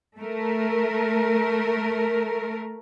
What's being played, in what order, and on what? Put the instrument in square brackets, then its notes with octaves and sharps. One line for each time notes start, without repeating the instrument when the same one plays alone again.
[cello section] A3 A#4